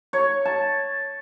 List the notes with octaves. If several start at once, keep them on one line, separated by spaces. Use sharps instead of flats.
C#5
A5